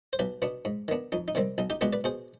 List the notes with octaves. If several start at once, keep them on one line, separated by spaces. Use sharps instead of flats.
C5
B1 G4 B4
B2 B3 D4
G#2
D#3 B3 D4
F2 D#4
D#4
C3 D#3 G3 C4
B1 D#4
D#4 G4
B2 G#3 B3 D4 G4 B4
B4 D5
B2 G#4 C5